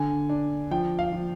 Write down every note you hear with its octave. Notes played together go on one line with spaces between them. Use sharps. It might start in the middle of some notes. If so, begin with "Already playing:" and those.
Already playing: D3 G#5
D4
F3 G5
F5
F3